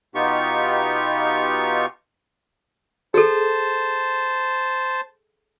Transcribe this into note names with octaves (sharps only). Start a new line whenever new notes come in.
B2 B3 D#4 F4 G4 C#6
G#4 A4 C5 A5